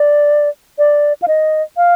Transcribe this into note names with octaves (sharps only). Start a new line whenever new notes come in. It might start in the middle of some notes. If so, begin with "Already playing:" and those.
Already playing: D5
D5
F5
D#5
F5